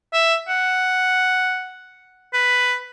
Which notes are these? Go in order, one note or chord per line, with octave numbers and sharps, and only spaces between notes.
E5
F#5
B4